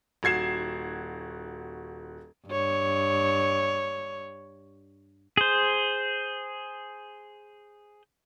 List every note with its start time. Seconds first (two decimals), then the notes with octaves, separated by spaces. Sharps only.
0.23 D#1 F#4 G#6 C7 E7
2.48 G2 C#5
5.37 G#4 C5